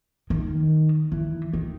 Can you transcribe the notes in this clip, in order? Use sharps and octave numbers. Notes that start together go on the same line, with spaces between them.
D#3
E3
D#3